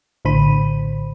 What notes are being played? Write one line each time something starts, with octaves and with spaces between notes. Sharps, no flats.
A#1 A2 D3 C5 B5 D#7